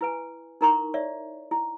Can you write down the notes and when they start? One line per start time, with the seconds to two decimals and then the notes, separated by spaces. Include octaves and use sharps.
0.01 E4 B4 G#5
0.61 D#4 E4 A#4 A#5 C6 C#6
0.94 C#5 D5 E5
1.51 E4